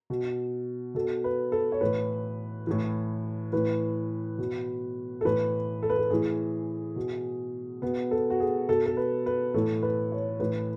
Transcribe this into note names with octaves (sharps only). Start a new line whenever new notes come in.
B2
B2 A4
B4
A4
C#5
A2 E3 B4
A2 E3
A2 E3 B4
B2
A4
A2 E3 B4
A4
B4
A4
A2 E3 G#4
B2
B2 B3
A4
F#4
G#4
B2 A4
A4
B4
B4
A2 E3 A4
B4
C#5
A2 E3 B4